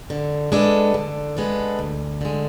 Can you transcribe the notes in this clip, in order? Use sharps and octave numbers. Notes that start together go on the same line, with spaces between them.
D3
G#3 B3 D4 A4
D3
G#3 B3 D4 A4
D2
D3 G#3